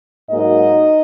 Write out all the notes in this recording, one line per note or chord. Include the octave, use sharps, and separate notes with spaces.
G#2 F#3 A#3 D#4 D#5